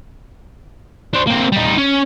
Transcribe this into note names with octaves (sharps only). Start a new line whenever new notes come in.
D4 C5
A#3 C4
G3 D#4
C#4